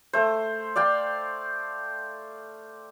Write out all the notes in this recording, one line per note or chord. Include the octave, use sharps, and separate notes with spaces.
A3 C5
D5 F5 G5 C6